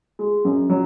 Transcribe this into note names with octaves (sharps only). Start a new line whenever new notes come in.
G#3
F#2
F#3